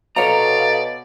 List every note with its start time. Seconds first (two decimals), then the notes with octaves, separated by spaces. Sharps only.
0.16 B2 A4 C#5 D5 F5 A#5